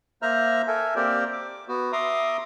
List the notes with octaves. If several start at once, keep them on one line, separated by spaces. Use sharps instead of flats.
A#3 C5 E5 A#5 F6
A4 A#4 E5 G#5
A#3 C4 G4 A#4 C5 D5
D6
B3 F#4
E5 A#5 C6 D6 D#6